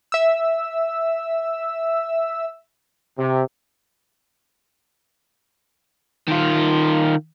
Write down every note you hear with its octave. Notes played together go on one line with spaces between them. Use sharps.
E5 E6
C3
D#3 F4